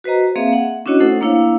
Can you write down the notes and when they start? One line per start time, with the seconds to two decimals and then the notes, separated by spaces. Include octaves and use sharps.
0.04 F#4 B4 C5 D#5 A#5
0.36 A#3 C4 G#4 E5 F5
0.53 F#5
0.86 C#4 D4 E4 F#4 C#5 D#5
1.00 A3 D#4 A4 C5 F#5
1.21 A#3 D4 E4 C#5 F5